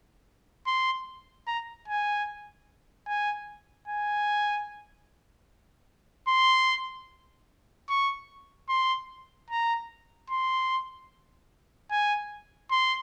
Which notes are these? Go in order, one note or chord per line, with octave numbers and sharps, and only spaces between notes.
C6
A#5
G#5
G#5
G#5
C6
C#6
C6
A#5
C6
G#5
C6